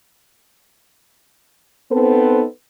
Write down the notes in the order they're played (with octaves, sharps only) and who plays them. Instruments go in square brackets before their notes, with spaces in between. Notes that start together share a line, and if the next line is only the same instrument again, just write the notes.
[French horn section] B3 C4 D#4 A4 B4 C5